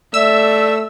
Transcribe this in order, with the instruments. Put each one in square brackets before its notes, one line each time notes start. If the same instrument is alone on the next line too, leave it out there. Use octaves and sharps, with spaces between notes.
[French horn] A3 [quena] D5 [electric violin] E5 [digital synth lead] E6